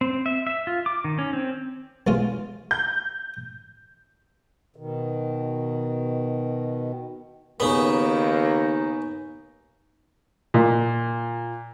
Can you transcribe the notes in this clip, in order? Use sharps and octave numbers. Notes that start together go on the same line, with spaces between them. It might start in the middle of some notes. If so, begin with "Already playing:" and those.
C4
E5
E5
F4
D6
D#3
C#4
C4
B1 G#3 F4
G6
B2 D#3
D#2 C#3 B3 D#4
A#2